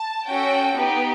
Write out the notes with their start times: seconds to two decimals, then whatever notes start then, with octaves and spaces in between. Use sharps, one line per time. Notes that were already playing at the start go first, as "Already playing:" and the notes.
Already playing: A5
0.27 C#4 F#4 A4 G5
0.75 B3 D#4 G4